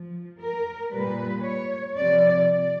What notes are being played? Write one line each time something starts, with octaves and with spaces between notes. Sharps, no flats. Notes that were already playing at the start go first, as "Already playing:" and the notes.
Already playing: F3
A#4
A#2 G3 B4
C#5
C3 F3 D5
D5